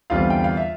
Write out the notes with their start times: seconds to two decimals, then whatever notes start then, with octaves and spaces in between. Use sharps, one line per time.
0.10 E2 D3 G3 C4 F4 F5
0.30 G5
0.44 F5
0.57 E5